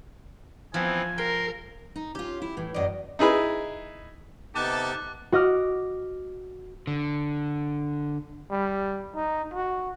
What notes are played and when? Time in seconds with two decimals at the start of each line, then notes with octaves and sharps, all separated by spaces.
0.74 E3 F3 B3 C4 G#5
1.18 A#4 G5 C6
1.96 D#4
2.15 C#4 F4 G4
2.42 E4
2.57 A2 E3
2.74 F#2 A2 D5 D#5
3.19 D#4 E4 G#4 B4
4.55 C3 B3 D#4 G4 A4 A5 D6 F#6
5.32 F#4 D#5 D6 F6
6.87 D3
8.51 G3
9.15 D#4
9.54 F#4